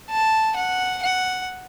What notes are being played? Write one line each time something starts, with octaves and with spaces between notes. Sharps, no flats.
A5
F#5
F#5